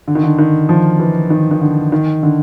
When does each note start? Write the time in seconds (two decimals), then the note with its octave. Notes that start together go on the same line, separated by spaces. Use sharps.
0.08 D3
0.15 D#3
0.23 D3
0.38 D#3
0.69 F3
0.99 E3
1.30 D#3
1.51 D#3
1.61 D3
1.92 D#3
2.23 D3